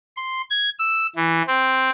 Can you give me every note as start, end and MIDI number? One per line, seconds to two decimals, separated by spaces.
0.17 0.42 84
0.50 0.69 92
0.79 1.07 88
1.16 1.42 52
1.47 1.90 60